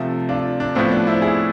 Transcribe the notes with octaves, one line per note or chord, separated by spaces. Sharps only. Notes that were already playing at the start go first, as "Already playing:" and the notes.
Already playing: C3 F3 A3
D4 F4
D4
A2 F3 B3 C4
D4
C4 E4
E4 G#4